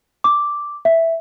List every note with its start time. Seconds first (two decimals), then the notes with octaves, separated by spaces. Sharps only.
0.24 D6
0.85 E5